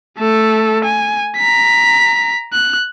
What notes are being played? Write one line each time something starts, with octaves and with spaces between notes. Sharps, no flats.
A3 A4
G#5
A#5 B6
F#6